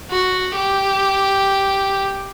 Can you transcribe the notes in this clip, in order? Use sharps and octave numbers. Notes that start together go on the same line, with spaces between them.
F#4
G4